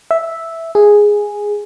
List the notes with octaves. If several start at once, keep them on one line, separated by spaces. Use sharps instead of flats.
E5
G#4